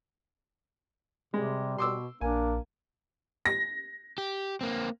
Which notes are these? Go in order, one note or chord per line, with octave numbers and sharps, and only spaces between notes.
C3 G3 G#3
B2 C6 D6 E6
A#1 A#3 D4 G#5
A#6
G4
A#3 C4